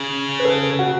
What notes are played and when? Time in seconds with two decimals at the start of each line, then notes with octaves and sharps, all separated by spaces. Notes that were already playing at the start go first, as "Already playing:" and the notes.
Already playing: C#3
0.39 B4
0.45 A4
0.79 F#4